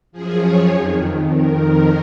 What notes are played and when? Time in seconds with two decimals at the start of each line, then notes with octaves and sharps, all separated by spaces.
0.12 F#2 F3 G#4
0.41 C#5
0.71 F2 D#3
1.29 F2 D#3 A#4
1.58 A#4